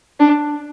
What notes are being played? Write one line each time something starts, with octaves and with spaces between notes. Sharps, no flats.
D4